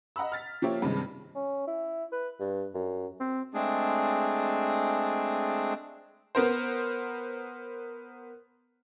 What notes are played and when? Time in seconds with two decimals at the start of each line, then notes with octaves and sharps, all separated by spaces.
0.16 D#5 F#5 A#5 B5 E6
0.32 F6 A6 B6
0.62 F3 A#3 G4 C#5 E5
0.82 G2 C3 D#3 G#3
1.35 C#4
1.67 E4
2.12 B4
2.40 G2
2.74 F#2
3.20 C4
3.54 G#3 A3 C4 D4 G#4
6.35 B3 A#4 C5